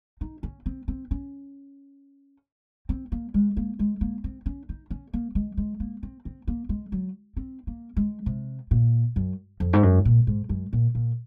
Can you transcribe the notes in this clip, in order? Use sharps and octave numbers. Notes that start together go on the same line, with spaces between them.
D#4
C#4
C4
C4
C#4
C4
A#3
G#3
A#3
G#3
A#3
C4
C#4
D#4
C#4
A#3
G#3
G#3
A#3
C4
C4
A#3
G#3
F#3
C4
A#3
G#3
C3
A#2
F#2
F2
G#2
F#2
A#2
G#2
F#2
A#2
A#2